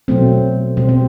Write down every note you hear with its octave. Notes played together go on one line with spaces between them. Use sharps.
B2 F#3 A3 C4
B2 G3 C4
C4